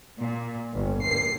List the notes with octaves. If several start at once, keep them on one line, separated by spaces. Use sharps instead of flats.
A#2
G1
C7